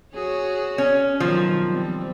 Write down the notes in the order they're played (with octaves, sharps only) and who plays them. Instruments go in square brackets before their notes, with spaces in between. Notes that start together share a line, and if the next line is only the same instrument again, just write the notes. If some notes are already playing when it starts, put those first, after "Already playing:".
[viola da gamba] F#4 G#4 C#5
[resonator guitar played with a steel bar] C#4
[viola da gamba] B2 D#3 F#3 [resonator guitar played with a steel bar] F3
[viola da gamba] G3 C4